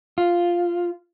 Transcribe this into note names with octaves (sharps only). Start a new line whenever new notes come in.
F4